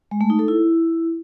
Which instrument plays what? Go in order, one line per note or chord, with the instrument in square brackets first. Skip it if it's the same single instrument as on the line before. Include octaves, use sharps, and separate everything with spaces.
[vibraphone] G#3
A3
D#4
A4
E4